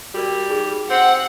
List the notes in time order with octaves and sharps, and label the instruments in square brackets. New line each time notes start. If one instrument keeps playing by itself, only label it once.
[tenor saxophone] G3 [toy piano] F#4 A#4 D5
[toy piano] D#4 G#4
[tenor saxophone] C4 [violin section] F#5